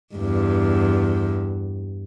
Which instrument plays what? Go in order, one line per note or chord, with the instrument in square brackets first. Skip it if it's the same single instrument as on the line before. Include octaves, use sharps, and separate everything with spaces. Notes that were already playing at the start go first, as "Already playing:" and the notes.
[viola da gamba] E2 G2